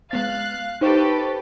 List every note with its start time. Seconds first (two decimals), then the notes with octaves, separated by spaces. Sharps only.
0.11 G#3 B3 F5 F#6 A6
0.81 D#4 G4 A4 B4 C5 C#6